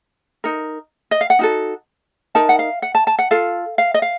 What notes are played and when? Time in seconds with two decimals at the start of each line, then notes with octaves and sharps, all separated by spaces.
0.44 D#4 A#4
1.11 D#5
1.21 F5
1.30 F#5
1.39 D#4 F#4 A4
2.35 D#4 A#4 A5
2.49 F#5
2.59 F5
2.82 F#5
2.95 A5
3.07 A5
3.19 F#5
3.31 F4 A4 F5
3.78 F5
3.94 D#5
4.02 F5